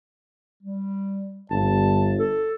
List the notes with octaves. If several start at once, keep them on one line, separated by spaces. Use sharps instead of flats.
G3
G1 A5
A4